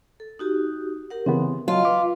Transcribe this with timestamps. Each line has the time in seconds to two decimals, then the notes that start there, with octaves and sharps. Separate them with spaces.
0.20 A4
0.39 D#4 F#4 G4
1.10 G4 A#4 F#5
1.26 C#3 E3 B3 C4
1.68 F#3 F4 D#5 F5 A5
1.85 B4 D6